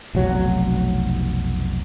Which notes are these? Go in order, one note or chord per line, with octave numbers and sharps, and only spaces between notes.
F1 B1 F#3